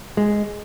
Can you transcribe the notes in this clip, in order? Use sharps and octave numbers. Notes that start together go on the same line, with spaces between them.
G#3